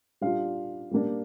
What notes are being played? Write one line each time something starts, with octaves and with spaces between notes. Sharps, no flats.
G3 D4 F4 F5
G3 A#3 D4